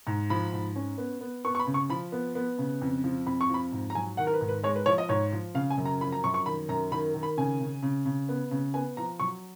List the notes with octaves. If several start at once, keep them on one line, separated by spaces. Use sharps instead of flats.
G#2
F3 B5
G#2
C#4
B3
B3
B3 C#6
C#6
B5
C#3
C#6
F3 B5
B3
B3
C#3
F2
F3
F2 B5
C#6
F3 B5
G#2
A#5
F#3 G#5
D#3 F#5
A#4
B4
G#2
B4
G#3 C#5
B4
F3 C#5
D#5
G#2 C#5
F3
C#3 F5
G#5
F#2
A#5
F3 B5
A#5
F#2 C#6
C#6
D#3 B5
F#2 A#5
D#3 B5
D#3
B5
C#3 G#5
C#3
C#3
C#3
B3
C#3
B3 G#5
F3 A#5
F#3 C#6